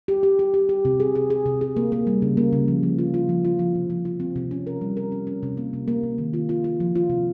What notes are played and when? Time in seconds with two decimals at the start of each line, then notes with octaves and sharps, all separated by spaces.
0.08 G4
0.23 G4
0.39 G4
0.54 G4
0.69 G4
0.85 C3
1.00 G#4
1.15 G#4
1.30 G#4
1.46 C3
1.61 G#4
1.77 A#3
1.92 A#3
2.07 G3
2.22 C#3
2.37 A#3
2.53 C#3
2.68 F3
2.83 F3
2.99 F4
3.14 F4
3.29 F3
3.45 F4
3.59 F3
3.75 C3
3.90 F3
4.05 F4
4.20 C4
4.36 C3
4.51 C#4
4.67 A#4
4.81 G3
4.97 A#4
5.12 C#4
5.27 C#4
5.43 C3
5.57 A#3
5.73 C3
5.88 A#3
6.03 C3
6.18 D#3
6.33 F4
6.49 F4
6.64 F4
6.80 F3
6.95 F4
7.10 C3